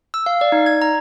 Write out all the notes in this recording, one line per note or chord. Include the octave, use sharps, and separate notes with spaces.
E6
F5
D5
D#4
G#6
A#5